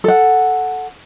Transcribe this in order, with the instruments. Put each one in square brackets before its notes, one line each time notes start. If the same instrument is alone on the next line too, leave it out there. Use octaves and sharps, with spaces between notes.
[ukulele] A4 F#5